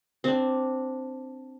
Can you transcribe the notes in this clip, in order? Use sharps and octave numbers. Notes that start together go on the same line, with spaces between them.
C4 D4